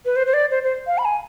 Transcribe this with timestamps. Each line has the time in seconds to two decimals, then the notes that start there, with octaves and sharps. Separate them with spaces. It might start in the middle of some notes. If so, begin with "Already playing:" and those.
0.05 B4
0.16 C5
0.27 C5
0.34 D5
0.51 C5
0.64 C5
0.87 F5
0.98 B5
1.05 G#5